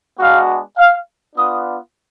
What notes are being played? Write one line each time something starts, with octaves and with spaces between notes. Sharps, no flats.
G#3 B3 D4 F#4 F5
F5
B3 D4 F4 D#6